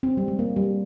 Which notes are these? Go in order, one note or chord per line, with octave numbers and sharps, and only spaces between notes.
C4
G3
G#3
A#3
G3